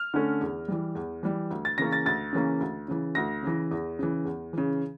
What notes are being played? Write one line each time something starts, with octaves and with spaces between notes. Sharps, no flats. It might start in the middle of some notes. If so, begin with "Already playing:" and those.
Already playing: F6
D3 A3 C#4
E2
E3 G3
E2
E3 G3
D2
A6
C#3 E3 A#3 C#4 A#6
A6
D2 A6
C#3 E3 A#3 C#4
D2
C#3 E3
D2 A#6
C#3 E3
E2
C#3 E3
E2
C#3 E3